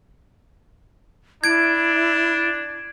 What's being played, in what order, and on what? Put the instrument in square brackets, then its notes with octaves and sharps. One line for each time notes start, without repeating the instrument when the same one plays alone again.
[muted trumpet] D4 [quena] E4 [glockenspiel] G#6 D7